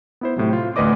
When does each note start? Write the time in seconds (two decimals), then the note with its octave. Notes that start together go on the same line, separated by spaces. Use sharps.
0.21 B3 E4 C5
0.36 A2 C3 F#3
0.53 F4
0.76 A1 D2 B4 D5 D#5 D6